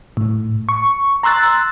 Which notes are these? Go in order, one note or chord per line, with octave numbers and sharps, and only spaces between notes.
A2
C#6
A#5 C6 E6 F#6 A6